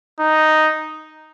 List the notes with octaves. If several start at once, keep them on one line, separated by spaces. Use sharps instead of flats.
D#4